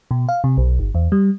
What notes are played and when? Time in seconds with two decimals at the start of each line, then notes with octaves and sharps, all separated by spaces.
0.11 B2
0.29 F5
0.44 C3
0.57 B1
0.79 G1
0.95 E2
1.12 G3